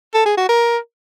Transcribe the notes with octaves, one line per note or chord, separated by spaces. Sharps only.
A4
G#4
F#4
A#4